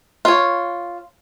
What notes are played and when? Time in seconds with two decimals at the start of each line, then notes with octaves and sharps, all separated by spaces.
0.25 F4 C#5